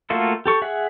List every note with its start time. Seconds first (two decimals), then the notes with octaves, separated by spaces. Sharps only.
0.10 A3 A#3 F4 F#4 A4
0.46 G4 A4 C#6
0.62 G#4 E5 F#5